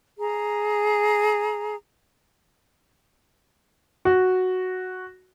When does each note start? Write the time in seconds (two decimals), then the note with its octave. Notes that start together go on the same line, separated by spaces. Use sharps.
0.19 G#4 A#5
4.05 F#4